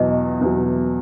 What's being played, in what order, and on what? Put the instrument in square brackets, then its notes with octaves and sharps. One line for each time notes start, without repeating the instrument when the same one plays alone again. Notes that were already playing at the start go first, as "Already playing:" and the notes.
Already playing: [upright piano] E2 B2 F#3 [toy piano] D#5
[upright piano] E2 B2 F#3